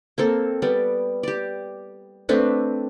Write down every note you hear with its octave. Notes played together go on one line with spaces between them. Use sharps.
A#3 C4 A4
G3 B3 D5
G4 D5
A3 C4 D4 B4